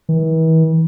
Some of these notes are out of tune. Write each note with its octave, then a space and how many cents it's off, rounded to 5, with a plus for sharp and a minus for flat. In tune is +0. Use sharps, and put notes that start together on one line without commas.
E3 -40